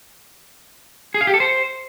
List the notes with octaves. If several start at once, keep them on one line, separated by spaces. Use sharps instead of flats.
G#4
F5
G4
A4
C5